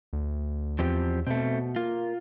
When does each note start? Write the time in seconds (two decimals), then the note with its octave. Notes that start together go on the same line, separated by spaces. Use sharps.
0.13 D2
0.79 E2 F3 C4 G4
1.27 B2 A3 C4
1.76 A#3 F4